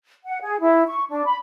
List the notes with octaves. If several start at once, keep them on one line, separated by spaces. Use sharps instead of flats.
F#5
G#4
E4
C#6
D4
B5